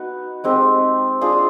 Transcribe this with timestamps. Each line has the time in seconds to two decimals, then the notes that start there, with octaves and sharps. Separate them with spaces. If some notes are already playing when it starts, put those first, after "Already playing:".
Already playing: B3 D#4 F#4 B4
0.44 G#3 C4 D#4 G4
1.21 D4 F4 G#4 C5